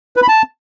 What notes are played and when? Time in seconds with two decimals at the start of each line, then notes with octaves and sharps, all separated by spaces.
0.16 B4
0.22 B5
0.28 A5